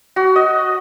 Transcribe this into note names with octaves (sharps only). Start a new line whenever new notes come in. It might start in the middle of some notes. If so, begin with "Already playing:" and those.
F#4
D#5